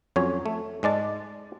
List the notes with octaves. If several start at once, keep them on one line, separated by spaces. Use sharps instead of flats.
F2 F#3 C#4 C#5
A3
G#2 G#3 D5 A5